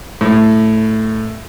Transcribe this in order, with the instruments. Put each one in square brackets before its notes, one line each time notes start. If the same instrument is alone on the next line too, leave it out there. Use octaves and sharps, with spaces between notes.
[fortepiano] A2